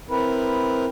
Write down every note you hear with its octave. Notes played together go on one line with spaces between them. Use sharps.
C4 E4 A#4 B4